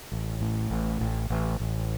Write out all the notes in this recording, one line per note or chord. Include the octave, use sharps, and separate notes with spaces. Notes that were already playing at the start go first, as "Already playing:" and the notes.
A1
A2
A1
A1
A1
A1